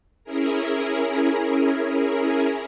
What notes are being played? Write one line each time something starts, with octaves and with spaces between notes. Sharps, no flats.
C#4 E4 G#4 A#4